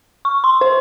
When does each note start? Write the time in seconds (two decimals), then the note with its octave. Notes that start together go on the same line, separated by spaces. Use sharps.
0.25 C#6
0.44 C6
0.61 C5